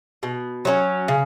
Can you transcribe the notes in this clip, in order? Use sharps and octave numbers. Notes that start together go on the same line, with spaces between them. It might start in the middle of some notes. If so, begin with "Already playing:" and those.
B2
F#3 A3 C#4
C#3